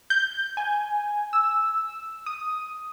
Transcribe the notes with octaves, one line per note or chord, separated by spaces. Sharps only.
G6
G#5
E6
D#6